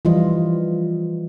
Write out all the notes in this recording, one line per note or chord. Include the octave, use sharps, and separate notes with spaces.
E3 F3 G3 F4 D#5